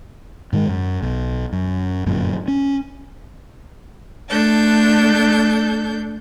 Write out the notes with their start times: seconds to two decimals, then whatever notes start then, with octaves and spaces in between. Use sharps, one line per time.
0.53 G#2 D#3 E3 G#3
0.68 F#2
1.02 B1
1.52 F#2
2.06 G1 F#2 A#2
2.48 C#4
4.30 A3 D4 A4 G6